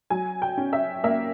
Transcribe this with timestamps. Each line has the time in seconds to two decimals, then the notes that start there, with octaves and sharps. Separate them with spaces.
0.10 F#3 G#5
0.42 G5
0.58 C#4
0.73 E5
1.04 A#3 E5